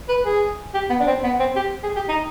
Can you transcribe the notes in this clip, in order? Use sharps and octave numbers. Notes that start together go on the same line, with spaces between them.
B4
G#4
G4
B3
D4
C4
B3
C4
G4
G#4
G4
D#4